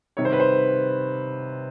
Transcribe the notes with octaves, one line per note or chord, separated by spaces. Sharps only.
C3 D#3 G3 C#5
C5
B4
C5